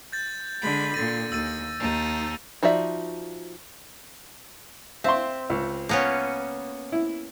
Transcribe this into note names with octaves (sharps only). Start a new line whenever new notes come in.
G6 A6
D3 G#3 B5
A#2 D3 A6 A#6 D#7
D#2 E6 A6 D#7
D#2 D#4 A5
F3 D#4 F#4 D5 E5
C4 E5 F5 C6
C#2
A#3 B3 C#4
E4